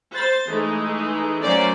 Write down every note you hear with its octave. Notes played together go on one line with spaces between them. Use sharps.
C5 A6
E3 G#3 A3 D#4
F#3 A3 A#3 C#4 C5 D5